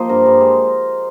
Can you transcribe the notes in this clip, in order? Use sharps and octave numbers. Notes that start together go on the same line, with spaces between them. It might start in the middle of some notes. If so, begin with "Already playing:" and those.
Already playing: F3 A#3 G4 C5 D#5
G2 A#4
G2
G#3